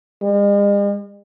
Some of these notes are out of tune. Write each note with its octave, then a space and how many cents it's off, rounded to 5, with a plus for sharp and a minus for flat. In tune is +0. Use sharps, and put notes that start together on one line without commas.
G#3 -45